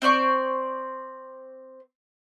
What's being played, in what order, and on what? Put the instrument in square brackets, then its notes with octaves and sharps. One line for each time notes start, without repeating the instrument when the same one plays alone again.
[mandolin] C4 C5 D5 C#6